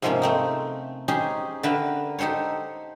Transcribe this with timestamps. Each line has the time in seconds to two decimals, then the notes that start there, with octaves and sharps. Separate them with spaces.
0.02 G#2 C3 F3 G#3 A#3 C#4
0.22 A3 C4 D#4
1.08 C#4 D#4 G4 G#4 C5
1.63 D3 A#4 B4 E5 G5 A5
2.19 D#4 G4 A4 C5 C#5